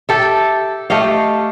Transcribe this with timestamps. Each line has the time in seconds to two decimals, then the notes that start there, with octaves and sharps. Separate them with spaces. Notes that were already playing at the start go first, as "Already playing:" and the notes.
0.09 G4 A4 E5
0.90 A3 G4 D#5 F5